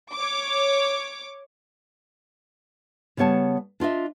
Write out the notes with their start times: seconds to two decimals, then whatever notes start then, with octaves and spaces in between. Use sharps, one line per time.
0.14 C#5 D6
3.17 C#3 G3 B3 C#5 A5
3.80 D4 F4 D#5 E5